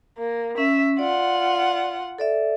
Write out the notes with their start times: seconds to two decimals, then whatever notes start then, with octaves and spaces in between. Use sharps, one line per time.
0.18 A#3
0.58 C#4 E5
0.99 F4 D5 F#5
2.19 A4 D5 E5